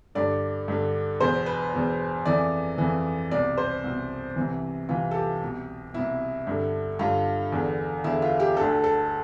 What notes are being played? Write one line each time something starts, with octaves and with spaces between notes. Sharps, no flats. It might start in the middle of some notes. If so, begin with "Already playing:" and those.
G2 D3 D5
G2 D3
E2 B2 C5
B4
E2 B2
F2 E3 D5
F2 E3
C2 B2 D5
C5
C2 B2
C2 C3 E3
C2 C3 E3 F4
A4
G4
C2 B2
C2 B2 E4
G2 D3
G2 D3 F4
E2 D3
E2 D3 E4
F4
G4
D2 D3 A4
A4